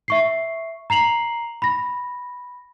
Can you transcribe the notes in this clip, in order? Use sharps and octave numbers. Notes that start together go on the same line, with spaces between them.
E5 C#6 C7
A#5 C7 F7 F#7
B5 A#6